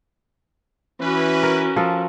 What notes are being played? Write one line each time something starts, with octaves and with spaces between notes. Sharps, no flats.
E3 C#4 F#4 B4
A#4
F3 A4 A#4